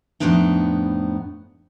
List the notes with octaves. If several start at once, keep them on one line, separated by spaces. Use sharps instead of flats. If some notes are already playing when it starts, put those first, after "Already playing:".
F2 A2 C#3 B3 D4 D#4